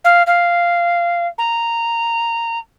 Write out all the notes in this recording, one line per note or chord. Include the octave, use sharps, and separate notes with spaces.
F5
F5
A#5